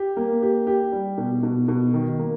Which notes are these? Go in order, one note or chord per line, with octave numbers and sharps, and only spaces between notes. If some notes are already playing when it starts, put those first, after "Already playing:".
Already playing: G4
A#3
G4
G4
G3
B2
B2
B2
D#3
A#3